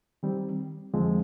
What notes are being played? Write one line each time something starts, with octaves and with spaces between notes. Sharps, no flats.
D#3 G3 C4
F2 D3 F3 G#3 C4